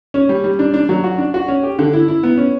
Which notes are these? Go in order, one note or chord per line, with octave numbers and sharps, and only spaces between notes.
C#4
G3
G3
D4
D4
F#3
F#4
D4
F#4
C#4
G4
D3
E4
E4
B3
C#4